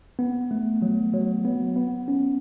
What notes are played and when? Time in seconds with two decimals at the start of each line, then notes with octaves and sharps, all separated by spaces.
0.19 B3
0.51 A3
0.82 F#3
1.14 F#3
1.45 B3
1.76 B3
2.08 C#4